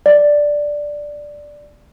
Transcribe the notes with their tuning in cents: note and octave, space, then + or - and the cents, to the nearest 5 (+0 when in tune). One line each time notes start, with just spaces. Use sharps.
D5 +0